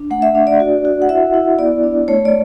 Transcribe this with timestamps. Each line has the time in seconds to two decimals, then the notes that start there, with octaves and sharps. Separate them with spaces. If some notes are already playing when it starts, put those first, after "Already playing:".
Already playing: D4
0.10 A3 F#5
0.22 E5
0.35 D4
0.47 D5
0.60 F#4
0.85 F#4
1.02 F#5
1.09 E4 E5
1.34 E4
1.58 B3 D5
1.83 D4
2.08 A3 C#5
2.25 D5